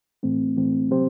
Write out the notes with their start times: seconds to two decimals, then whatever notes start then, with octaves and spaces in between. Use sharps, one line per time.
0.23 A2 E3 A3 C4
0.57 A2 E3 A3 C4
0.91 C3 F#3 C4 G4 C5